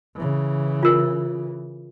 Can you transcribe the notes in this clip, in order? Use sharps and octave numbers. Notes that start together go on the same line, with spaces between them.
C#3 E3
F4 A#4